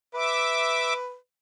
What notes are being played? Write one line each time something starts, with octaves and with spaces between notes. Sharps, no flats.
B4 E5 D6